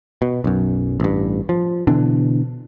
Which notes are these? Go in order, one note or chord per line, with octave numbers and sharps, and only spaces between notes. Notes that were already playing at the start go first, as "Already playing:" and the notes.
B2
B1 F#2
A1 G2
F3
B2 D3 E3 D4